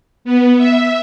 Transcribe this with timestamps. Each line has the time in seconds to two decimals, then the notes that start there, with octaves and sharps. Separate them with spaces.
0.25 B3
0.58 E5